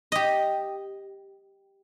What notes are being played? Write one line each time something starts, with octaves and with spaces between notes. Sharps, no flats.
G4 D#5